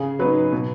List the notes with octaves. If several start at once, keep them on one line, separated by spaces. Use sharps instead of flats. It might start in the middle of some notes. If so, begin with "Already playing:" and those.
Already playing: C#3 G#4
F#3 B3 D#4 B4
B2